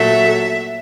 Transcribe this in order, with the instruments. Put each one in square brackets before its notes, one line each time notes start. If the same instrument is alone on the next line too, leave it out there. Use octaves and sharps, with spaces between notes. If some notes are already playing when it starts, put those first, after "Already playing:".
Already playing: [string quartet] A#2 F#3 A3 E5